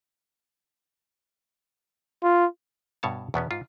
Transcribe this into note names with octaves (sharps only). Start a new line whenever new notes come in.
F4
G2 B2 C#5 A5
E2 B2 B3 C#4
G#2 F4